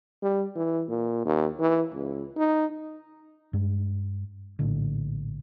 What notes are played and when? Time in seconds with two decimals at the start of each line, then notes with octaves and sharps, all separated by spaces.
0.22 G3
0.56 E3
0.88 A#2
1.25 D#2
1.59 E3
1.93 C#2
2.37 D#4
3.53 G2 G#3
4.59 A#1 A2 D3